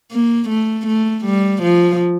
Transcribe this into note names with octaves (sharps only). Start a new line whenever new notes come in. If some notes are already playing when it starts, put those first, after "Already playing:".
A#3
A3
A3
G3
F3